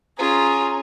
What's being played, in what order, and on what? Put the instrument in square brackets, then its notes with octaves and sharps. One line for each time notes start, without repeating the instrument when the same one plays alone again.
[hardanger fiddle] C#4 [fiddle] F4 [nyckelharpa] G#4 [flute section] A#5